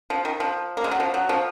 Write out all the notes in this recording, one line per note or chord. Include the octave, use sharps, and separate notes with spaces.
F3
D#3
F3
A#3
G#3
F#3
F3
F#3
F3